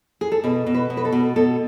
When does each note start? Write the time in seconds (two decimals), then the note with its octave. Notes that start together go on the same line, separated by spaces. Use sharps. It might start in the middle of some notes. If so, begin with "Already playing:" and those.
0.21 G#4
0.32 A4
0.44 B2 B4
0.67 B2
0.74 B4
0.90 B2
0.97 B4
1.05 A4
1.12 B2
1.36 B2 A4